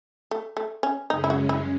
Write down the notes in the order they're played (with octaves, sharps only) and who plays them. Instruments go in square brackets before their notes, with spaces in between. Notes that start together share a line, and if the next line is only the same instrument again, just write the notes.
[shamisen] A3
A3
C#4
[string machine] F#2 C#3 G#3 C#4 [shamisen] D#4
[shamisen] E4
F#4
E4